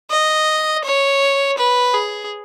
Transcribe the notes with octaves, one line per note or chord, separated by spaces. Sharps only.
D#5
C#5
B4
G#4